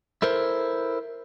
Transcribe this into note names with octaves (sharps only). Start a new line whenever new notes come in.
E4 A4 A#4 C5